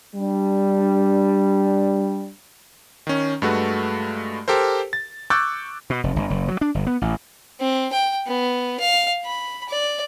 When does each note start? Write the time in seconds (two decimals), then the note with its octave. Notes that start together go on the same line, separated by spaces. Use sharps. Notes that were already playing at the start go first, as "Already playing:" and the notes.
0.15 G3 D4
3.07 D#3 C#4
3.42 G2 G#3 A3 F#4 B4
4.48 G4 A4 A#4 C5
4.93 A6
5.30 C#6 D6 E6 F#6 G6 A6
5.90 B2
6.04 F1
6.16 G1
6.30 F#1
6.48 F#3
6.61 D4
6.75 G1
6.87 B3
7.02 A1
7.60 C4
7.93 G5
8.27 B3
8.80 F5
9.25 B5
9.69 D5